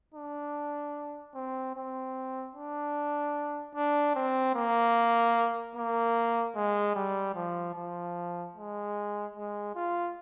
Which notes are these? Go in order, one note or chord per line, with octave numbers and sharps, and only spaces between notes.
D4
C4
C4
D4
D4
C4
A#3
A#3
G#3
G3
F3
F3
G#3
G#3
F4